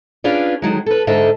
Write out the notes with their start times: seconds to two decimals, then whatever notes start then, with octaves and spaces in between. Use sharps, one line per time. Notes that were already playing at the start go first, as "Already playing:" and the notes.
0.24 C#4 D4 F4 G#4 B4 D5
0.62 D3 D#3 F#3 G#3
0.86 A4 B4
1.07 G#2 D3 A4 D#5 E5